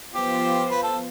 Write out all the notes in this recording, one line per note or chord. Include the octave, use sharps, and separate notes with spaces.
F3 B3 F4 G4 C5
B4
A4